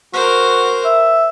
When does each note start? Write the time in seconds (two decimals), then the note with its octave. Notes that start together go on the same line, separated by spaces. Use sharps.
0.14 F#4 A#4 C5
0.85 E5